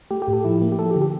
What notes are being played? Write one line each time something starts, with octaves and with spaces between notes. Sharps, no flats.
A3 G4
G4
A2
A4
F3 E4
A#3
G4
F3 A4
G4
D3
G4